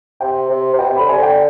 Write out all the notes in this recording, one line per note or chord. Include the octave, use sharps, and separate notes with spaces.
C3 G5
C3
C3
B2 G5
C3
D3 B5
C3 G#5
D3
G5